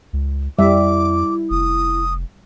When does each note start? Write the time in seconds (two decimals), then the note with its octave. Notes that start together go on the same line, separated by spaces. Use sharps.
0.13 C#2
0.59 F2 G3 E4 E5 D6
1.50 F1 D#6